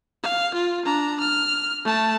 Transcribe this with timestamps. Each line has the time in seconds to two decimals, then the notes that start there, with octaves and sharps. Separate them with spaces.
0.23 F5
0.54 F4
0.85 D4 A#5
1.20 F6
1.85 A3 A5